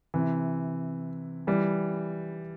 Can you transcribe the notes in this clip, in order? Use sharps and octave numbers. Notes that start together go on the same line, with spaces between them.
C3 E3
E3 G3